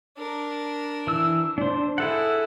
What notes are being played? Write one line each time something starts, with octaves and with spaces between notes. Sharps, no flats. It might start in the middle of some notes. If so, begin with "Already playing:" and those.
D4 A#4
E3 E6
D4 C5
E4 G#4 A4 F#5